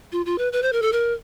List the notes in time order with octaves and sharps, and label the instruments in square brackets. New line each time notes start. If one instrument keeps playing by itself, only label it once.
[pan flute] F4
F4
B4
B4
C5
A#4
A4
A#4